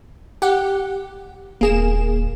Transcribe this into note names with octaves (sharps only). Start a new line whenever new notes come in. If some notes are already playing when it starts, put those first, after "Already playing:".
G4 F#5
D#1 A#3 G#4 E7